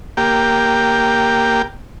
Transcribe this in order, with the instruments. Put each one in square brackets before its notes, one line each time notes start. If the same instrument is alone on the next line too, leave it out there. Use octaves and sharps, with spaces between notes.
[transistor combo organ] A#3 G4